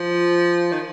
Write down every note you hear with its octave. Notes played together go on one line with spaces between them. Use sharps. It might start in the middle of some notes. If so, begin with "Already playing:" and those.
Already playing: F3
D#3